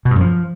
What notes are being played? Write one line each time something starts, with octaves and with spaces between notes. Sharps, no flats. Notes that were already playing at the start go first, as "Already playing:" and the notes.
B2
G2
F#2
F3